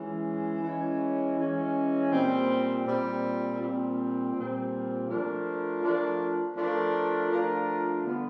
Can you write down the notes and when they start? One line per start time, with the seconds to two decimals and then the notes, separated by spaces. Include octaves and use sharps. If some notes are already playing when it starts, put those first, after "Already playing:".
Already playing: E3 G#3 C#4
0.63 E3 G#3 C#4
1.38 E3 G#3 C#4
2.11 A#2 G3 C4
2.85 A#2 G3 C4
3.60 A#2 G3 C4
4.34 A#2 G3 C4
5.08 F3 A3 D4 F4 A#4
5.82 F3 A3 D4 F4 A#4
6.55 F3 A3 D4 F4 A#4
7.29 F3 A3 D4 F4 A#4
8.04 D3 G3 B3